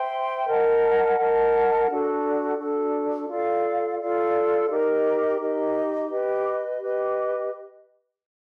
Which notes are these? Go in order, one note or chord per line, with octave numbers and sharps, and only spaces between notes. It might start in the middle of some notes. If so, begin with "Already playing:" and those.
Already playing: C5 E5 G5 C6
A#4 D#5 F#5 A5
A#4 D#5 F#5 A5
D4 F#4 A4
D4 F#4 A4
F4 A4 D5 F5
F4 A4 D5 F5
D#4 G4 A#4 D#5
D#4 G4 A#4 D#5
G4 B4 D#5
G4 B4 D#5